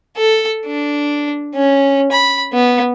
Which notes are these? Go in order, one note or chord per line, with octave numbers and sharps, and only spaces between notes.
A4
D4
C#4
B5
B3